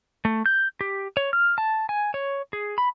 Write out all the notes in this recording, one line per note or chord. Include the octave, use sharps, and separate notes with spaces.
A3
G6
G4
C#5
F6
A5
G#5
C#5
G#4
B5